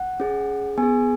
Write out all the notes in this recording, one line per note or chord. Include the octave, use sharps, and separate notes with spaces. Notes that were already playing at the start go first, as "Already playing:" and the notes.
Already playing: F#5
C#4 G#4
B3 G#4 G#5